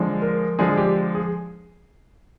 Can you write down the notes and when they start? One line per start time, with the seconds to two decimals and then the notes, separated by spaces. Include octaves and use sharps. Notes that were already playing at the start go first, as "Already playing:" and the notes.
Already playing: D3 F3 G#3 D4
0.22 A#4
0.59 D3 F3 G#3 D4 G#4
0.77 G4
1.15 G#4